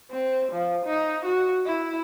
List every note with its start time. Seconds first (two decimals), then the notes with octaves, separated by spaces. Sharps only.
0.11 C4
0.52 F3
0.85 D#4
1.25 F#4
1.66 E4